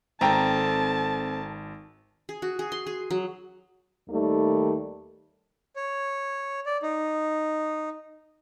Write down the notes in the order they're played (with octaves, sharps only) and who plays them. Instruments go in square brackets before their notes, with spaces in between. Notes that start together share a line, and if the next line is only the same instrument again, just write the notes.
[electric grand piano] G#1 [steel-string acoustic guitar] C4 A4 [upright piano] G5 A#5 [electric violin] A5
[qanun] G#4
F#4
G#4
C6
G#4
F#3
[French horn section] D#2 D#3 G3 A3
[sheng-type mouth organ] C#5
D5
D#4